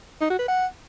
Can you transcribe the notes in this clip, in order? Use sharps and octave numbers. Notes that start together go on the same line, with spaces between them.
D#4
F#4
B4
F#5